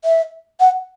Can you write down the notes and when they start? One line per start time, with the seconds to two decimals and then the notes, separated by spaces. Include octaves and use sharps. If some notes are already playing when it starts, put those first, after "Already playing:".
0.05 E5
0.60 F#5